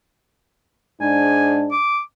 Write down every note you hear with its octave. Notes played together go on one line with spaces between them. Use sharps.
G#2 D4 G#5
D6